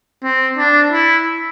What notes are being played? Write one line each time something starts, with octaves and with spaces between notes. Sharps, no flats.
C4
D4
E4